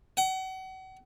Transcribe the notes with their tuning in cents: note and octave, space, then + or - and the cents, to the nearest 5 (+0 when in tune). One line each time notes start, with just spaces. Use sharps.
F#5 +35